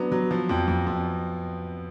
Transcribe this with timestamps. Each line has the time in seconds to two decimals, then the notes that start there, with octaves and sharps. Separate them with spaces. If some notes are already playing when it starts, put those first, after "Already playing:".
Already playing: F#3 B3 D4
0.12 F#3
0.31 F3
0.49 F2
0.68 F2
0.87 F2